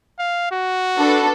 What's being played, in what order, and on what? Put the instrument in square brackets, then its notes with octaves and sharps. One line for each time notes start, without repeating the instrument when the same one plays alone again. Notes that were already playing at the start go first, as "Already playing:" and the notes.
[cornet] F5
F#4
[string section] D4 A4 B4